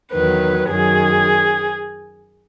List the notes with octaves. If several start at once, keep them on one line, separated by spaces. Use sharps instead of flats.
E2 D#3 F#3 B4
F#2 D#3 F#3 G#4